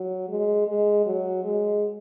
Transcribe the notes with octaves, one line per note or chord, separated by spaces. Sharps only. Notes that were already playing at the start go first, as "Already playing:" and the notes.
Already playing: F#3
G#3
G#3
F#3
G#3